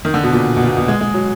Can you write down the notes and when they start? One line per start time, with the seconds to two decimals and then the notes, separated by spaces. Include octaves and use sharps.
0.05 D#3
0.14 D3
0.24 B2
0.32 A#2
0.57 B2
0.63 A#2
0.77 B2
0.88 G#3
1.01 G#3
1.14 F#3